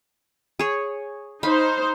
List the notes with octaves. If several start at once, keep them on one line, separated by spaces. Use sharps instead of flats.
G#4 C#5
D#4 C5 F5 B5